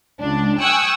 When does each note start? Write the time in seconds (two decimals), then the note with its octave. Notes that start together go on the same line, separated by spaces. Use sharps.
0.20 C#2 D4
0.60 G5 G#5 C#6 D#6 E6 F#6